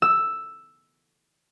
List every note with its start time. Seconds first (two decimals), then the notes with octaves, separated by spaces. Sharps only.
0.02 E6